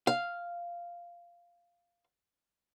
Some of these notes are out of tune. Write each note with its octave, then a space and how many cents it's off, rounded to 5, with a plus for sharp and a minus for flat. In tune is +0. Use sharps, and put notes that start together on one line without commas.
F5 -5